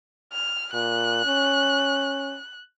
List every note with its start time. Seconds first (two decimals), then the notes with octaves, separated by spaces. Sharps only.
0.32 F6
0.74 A#2 F#6
1.26 C#4